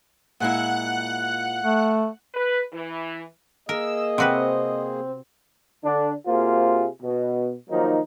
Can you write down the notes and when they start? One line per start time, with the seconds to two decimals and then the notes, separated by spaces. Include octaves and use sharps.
0.40 A#2 G#3 E4 F#5 F#6
1.64 A3
2.34 B4
2.73 E3
3.69 A#3 G#4 A#4 D#5 E6
4.18 C3 C4 F#4 B4
5.84 D3 D4
6.26 C3 A#3 F4 F#4 G#4 C5
7.02 B2
7.70 D#3 F3 F#3 A#3 D#4